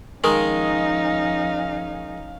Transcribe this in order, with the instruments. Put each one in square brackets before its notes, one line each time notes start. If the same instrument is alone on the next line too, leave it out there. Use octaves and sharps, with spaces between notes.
[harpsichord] D#3 G#3 A#4 [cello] F3 D#4 [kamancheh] C#4 F5